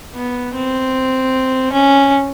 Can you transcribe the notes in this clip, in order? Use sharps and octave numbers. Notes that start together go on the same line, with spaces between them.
B3
C4
C#4